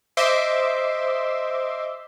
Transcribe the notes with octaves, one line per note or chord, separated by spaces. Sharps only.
C5 D#5 E5 C6 D6